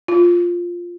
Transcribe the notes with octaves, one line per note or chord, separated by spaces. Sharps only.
F4